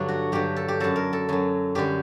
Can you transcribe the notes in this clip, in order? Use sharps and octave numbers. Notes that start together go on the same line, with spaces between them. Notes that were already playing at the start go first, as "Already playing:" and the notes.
Already playing: G2 D3 F#3 D4
F#4
G2 D3 F#3 G4
A4
G4
F#2 F#3 A4
A#4
A4
F#2 F#3
F#2 D3 G3 G4